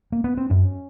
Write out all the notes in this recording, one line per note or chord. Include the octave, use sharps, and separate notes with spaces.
A#3
B3
C4
F#2 C#4